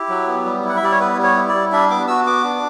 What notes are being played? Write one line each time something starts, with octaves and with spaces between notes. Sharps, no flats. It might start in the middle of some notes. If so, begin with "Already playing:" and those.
Already playing: E4 G4
F#3
B3
G3
E4 F#5
E5
G3 D5
C#5
B3 B4
G3
C#5
E4
G3 D5
D4 E5
B3 D6
F#4 E6
B3 D6
D4